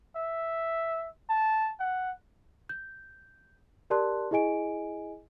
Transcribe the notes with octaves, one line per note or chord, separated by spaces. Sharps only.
E5
A5
F#5
G6
G4 A#4 D5 A5 C6 F#6
E4 G#4 D#5 G#5 D7